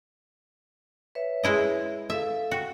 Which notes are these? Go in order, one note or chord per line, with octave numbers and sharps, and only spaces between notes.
B4 C#5 E5
G#3 E4 D#5
A4 E5 F5
F#4 G5